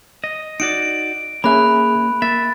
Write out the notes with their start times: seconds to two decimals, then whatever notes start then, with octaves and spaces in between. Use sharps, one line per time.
0.24 D#5
0.60 D#4 F#4 D5 D7
1.44 A#3 C#4 G#4 E5 B5 F#6
2.22 A#3 E5 A6